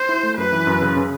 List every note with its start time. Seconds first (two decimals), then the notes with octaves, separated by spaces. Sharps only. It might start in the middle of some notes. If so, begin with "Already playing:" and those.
Already playing: C5
0.09 E4
0.23 A3
0.38 F#2 B4
0.53 E3
0.67 F#2
0.82 C#3
0.96 C#3